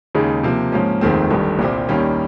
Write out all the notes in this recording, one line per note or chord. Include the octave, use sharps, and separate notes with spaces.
D#2 C#3 G#3 D#4
C3 F3 A#3
G#2 F3 A#3 C#4
F1 D#2 D#3 G#3 C4
G1 G2 D#3 G3
C2 A#2 G3 C4 G4
D#2 D#3 G3 A#3 C#4